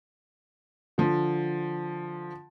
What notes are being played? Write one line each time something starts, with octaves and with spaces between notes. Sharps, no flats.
D3 F3